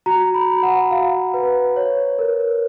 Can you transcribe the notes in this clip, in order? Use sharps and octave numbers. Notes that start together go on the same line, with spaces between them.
F#4 A#5
B5
F#4
F#5
F#4 F5
B4
C#5
A#4